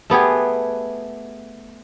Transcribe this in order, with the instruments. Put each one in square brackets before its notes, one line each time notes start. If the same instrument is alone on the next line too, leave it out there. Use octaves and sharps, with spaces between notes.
[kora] A3 B3 G4 G#4